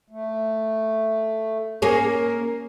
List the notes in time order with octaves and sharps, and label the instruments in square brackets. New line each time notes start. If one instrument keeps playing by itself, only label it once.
[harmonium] A3
[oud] A#3 G#4 C#5 [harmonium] C#4 A#4